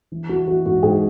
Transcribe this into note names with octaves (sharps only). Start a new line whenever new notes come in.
E3
E3 F#4
E3 F#4
G#2 F#4
G#2 G#4